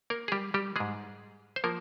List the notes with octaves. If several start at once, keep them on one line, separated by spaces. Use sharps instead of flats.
A#3 A#4
G#4
G3 G4
G3 G4
G#2 G3 G#3 G#4
C5
F3 A#3 A#4